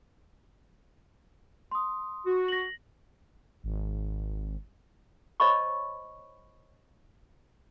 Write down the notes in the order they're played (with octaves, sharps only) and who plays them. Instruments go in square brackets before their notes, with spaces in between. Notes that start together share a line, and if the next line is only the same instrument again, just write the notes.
[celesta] C6 D#6
[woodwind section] F#4
[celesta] A#6 F#7
[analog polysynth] G#1
[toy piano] C5 C#5 D#5 A5 B5 C#6